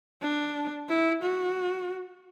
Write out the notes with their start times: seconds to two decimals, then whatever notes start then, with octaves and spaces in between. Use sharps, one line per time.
0.22 D4
0.89 E4
1.23 F#4